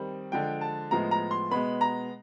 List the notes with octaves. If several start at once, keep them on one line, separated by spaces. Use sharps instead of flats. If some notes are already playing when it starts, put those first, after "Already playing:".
Already playing: D#3 G3 C4
D3 F3 G#3 G5
A5
A2 F3 G#3 B3 A#5
A#5
C6
B2 G#3 B3 B5
A#5